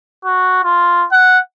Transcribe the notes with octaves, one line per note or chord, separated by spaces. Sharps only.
F#4
F4
F#5